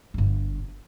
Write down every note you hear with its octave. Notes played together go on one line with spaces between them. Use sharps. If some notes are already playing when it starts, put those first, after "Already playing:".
G1 G2